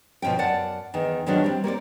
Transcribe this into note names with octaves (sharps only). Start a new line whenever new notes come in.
D2 B2 F3 C#4 G5
F#2 D5 F#5 A5
E2 D#3
E2 D#3 F3 F#3 C#4 D4
G3 C4
A#3 C4 C#5 D5